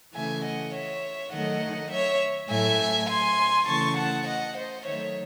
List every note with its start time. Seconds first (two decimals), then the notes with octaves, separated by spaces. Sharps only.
0.14 C#3 E3 A3 E5 G#5
0.44 D#5 F#5
0.73 C#5 E5
1.32 D#3 F#3 A3 D#5 F#5
1.91 C#5 E5
2.50 A2 F#3 A3 E5 G#5
3.09 G#5 C6
3.68 C#3 E3 A3 A5 C#6
3.97 F#5 A5
4.26 D#5 F#5
4.56 C5 D#5
4.85 D#3 F#3 A3 C#5 E5